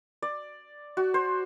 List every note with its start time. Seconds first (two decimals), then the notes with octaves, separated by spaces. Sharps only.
0.22 D5
0.97 F#4
1.14 C5